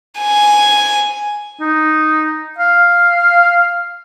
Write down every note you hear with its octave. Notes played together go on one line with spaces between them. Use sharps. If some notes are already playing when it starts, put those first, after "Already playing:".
G#5
D#4
F5